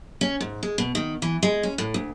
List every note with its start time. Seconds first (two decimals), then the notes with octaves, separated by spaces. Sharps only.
0.21 C#4
0.40 G#2
0.63 G#3
0.78 B2
0.95 D#3
1.22 E3
1.43 G#3
1.63 C#4
1.78 A2
1.94 D2